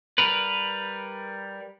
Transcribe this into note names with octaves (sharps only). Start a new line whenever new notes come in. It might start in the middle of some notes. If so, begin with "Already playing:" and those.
G3 A#4 B4